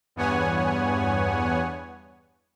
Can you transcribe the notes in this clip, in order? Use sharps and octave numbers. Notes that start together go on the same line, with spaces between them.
E2 G2 B3 C#5 F#5 G#5